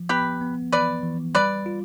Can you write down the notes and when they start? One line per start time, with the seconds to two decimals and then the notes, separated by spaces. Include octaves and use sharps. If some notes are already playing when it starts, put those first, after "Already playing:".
Already playing: F3
0.09 B3 G4 B4
0.41 B3
0.72 E3 B4 D5
1.03 E3
1.35 G3 B4 D5
1.66 F4